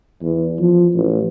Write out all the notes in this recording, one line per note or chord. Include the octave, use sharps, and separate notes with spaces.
E2
F3
A1